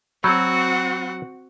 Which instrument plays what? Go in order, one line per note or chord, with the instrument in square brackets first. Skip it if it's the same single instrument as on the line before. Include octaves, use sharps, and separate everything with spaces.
[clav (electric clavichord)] F#3 [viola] C4 F#4 [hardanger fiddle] F#5 [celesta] B5 E6 G6